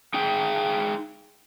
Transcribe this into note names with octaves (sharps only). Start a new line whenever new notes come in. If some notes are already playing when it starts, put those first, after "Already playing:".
D#4 G#4 G5